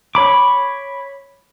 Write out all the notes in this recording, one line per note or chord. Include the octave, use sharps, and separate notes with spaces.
C#5 B5 D6